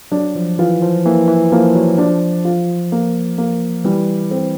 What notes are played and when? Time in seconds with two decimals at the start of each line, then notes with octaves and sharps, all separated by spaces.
0.12 F#3 D4
0.36 F3
0.59 E3 F4
0.82 F3
1.05 E3 A#3
1.28 E3
1.52 F3 A#3
1.76 F#3
1.98 F3 D4
2.45 F4
2.92 A#3
3.38 A#3
3.84 E3 G3
4.31 C4